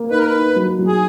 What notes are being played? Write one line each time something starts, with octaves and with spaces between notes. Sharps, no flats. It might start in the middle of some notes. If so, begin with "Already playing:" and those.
Already playing: A#3
D#4 B4
A#4
B4
D#4
F#3
F#3
G#4